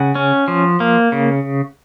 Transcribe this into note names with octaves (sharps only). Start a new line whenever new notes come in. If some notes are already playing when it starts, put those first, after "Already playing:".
Already playing: C#3 F#5
C#4
F3
A#3
C#3